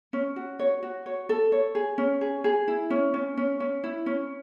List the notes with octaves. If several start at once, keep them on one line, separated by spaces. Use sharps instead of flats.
C#4
F#4
C#5
F#4
C#5
A4
C#5
G#4
C#4
G#4
G#4
E4
C#4
C#4
C#4
C#4
E4
C#4